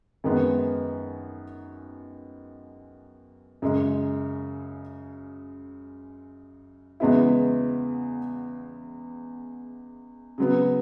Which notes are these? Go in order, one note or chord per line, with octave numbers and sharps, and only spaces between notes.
F#2 D#3 G#3 B3
F#2 C#3 G#3
E2 C#3 G#3 B3 E4
C#3 F#3 B3